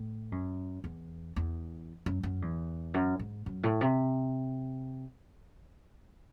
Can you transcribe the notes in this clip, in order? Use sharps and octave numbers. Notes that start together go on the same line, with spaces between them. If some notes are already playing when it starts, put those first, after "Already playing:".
Already playing: A2
F#2
E2
E2
F#2
F#2
E2
F#2
G#2
F#2
A2
C3